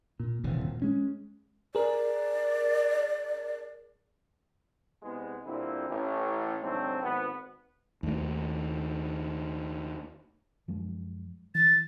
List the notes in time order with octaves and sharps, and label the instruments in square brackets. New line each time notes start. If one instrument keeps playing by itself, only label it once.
[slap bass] A#2
D#1 D2 C3 E3
A#2
G#3 C#4
[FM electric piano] G#4 A#4 [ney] D5
[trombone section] C2 G#3 B3
A#2 D3 G3 C4 E4
A1 A2
C2 G#2 D3 F#3 A3 C4
G#1 B3
[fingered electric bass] D#2 A3
F#2 F3 G#3
[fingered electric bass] E3 [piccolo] A6